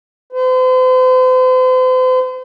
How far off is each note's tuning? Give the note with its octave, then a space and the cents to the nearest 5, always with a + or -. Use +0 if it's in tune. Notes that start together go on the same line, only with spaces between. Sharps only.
C5 -40